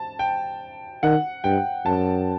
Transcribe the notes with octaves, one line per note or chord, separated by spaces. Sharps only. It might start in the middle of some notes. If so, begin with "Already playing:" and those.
Already playing: A5
G5
D#3 F#5
G2 G5
F#2 A5